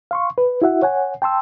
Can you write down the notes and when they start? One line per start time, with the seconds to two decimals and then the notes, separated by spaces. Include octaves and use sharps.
0.11 F5 C6 C#6
0.38 B4
0.62 E4 F#4 E5 F#5
0.82 C#5 F#5 G#5
1.22 G5 A5 C6 E6